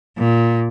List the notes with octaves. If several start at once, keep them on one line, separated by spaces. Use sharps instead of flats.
A#2